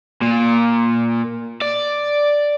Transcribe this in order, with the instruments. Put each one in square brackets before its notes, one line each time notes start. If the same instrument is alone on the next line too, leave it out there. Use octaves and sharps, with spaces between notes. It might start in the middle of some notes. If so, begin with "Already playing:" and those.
[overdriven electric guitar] A#2
D5